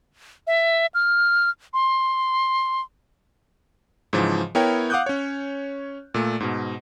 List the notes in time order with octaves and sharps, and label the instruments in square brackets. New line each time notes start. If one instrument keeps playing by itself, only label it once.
[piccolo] E5
F6
C6
[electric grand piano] G#2 C#3 E3 F3
B3 E4 A#4 C#5 G5
F5 F#5 D6 D#6 F#6 G6
C#4 C#5
A#2 A3
G#2 B2